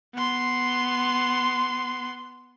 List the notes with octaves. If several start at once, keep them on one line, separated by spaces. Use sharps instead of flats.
B3 C6